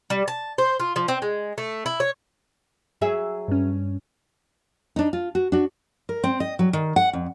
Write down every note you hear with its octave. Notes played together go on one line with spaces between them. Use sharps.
G3
A5
C5
F4
F3
C4
G#3
A3
E4
C#5
F#3 G#4 E5
G2 C#4
D4 D#4
F4
F#4
D4 F#4
A#4
C4
D#5
F#3
D#3
F#5
F2